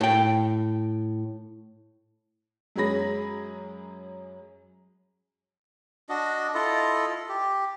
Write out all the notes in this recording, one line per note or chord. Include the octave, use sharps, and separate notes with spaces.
A2 G5
F#2 G#3 C#4 G#4 B5 A#6
D4 F#4 D#5
E4 F4 A4 D#5
G4